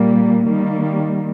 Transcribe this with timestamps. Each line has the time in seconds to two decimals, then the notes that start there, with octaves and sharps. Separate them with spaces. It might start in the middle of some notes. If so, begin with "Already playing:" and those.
Already playing: A#2 G3 A#3
0.47 D#3 G3 A#3